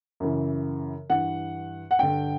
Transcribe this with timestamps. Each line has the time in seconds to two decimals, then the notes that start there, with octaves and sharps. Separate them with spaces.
0.20 F#2 C#3 E3
1.10 G2 E3 F#5
1.91 F#5
1.99 G2 D3 G5